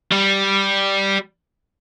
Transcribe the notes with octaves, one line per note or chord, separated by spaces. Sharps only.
G3